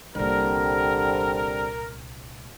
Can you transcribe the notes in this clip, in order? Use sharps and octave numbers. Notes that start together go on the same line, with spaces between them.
C2 A#2 D3 G3 C4 A#4